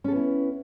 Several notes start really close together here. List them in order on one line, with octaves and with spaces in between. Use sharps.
C#4 A4 B3 E4